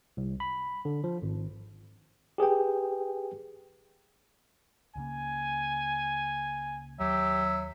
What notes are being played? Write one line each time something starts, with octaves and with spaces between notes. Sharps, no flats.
C2
B5
D3
F3
G#1
G4 G#4 B4 G5
C#2 C#3 A#3 G#5
D#2 F#3 G4 E5